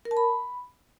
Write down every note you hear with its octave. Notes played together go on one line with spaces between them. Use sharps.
A#4
A5
B5